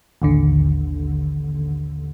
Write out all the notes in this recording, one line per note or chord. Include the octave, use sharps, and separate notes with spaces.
A1 D#2 D3